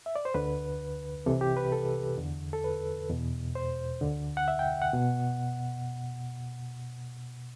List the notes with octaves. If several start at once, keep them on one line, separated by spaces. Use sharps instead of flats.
E5
D5
C5
D2 D3 B4
C2 C3 E3 A4
G4
B4
A4
E2 D3
A4
B4
E2 B2
C5
D2 D3
F#5
E5
G5
F#5
B2